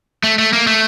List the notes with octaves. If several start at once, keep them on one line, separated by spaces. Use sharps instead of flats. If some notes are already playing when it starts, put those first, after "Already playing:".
A3
A3
A#3
A3